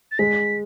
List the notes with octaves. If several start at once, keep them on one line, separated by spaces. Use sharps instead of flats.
A6
G#3 B6